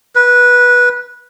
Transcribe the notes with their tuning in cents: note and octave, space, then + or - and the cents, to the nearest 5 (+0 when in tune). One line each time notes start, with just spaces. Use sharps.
B4 -15